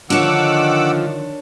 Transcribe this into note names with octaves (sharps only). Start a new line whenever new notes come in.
D3 D#3 F3 D4 C#5 F#5 D6 E6